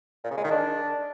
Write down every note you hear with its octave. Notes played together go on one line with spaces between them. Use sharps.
A#2
C#3
G#3
D#3
D4